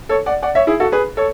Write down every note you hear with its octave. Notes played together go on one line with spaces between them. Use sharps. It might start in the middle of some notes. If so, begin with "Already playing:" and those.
A4 C#5
D5 F#5
D5 F#5
C#5 E5
E4 G#4
F#4 A4
G#4 B4
A4 C#5